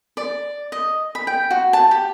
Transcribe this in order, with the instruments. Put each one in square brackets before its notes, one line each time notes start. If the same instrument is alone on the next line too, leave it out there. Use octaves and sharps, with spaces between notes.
[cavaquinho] D5
D#5
B5
G5
F#4
A5
G4